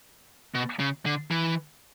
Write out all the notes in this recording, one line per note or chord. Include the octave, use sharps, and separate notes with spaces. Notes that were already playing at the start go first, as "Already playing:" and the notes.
B2
C#3
D3
E3